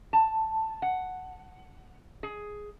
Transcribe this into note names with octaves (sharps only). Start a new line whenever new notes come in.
A5
F#5
G#4